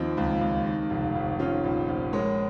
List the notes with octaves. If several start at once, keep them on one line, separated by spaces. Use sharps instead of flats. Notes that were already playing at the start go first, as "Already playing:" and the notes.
Already playing: D#2 F3 C4 D#4
C#2
C#2
D#3
F1
F1
D#3 C#4 F4
A#1
A#1
G#3 A#4 C#5